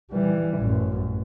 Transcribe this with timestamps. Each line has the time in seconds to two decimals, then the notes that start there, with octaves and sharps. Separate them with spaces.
0.12 E3 G3
0.59 A1 F#2